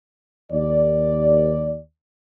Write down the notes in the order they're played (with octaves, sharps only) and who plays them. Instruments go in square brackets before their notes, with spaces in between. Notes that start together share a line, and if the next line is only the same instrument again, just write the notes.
[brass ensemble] D#2 D5